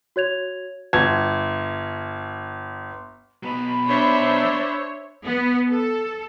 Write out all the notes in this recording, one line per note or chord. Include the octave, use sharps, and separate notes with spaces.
F#4 C#5 G#6 F7
G1 G#6
F#3 B3 B5
D4 C5 C#5 E5
B3
A4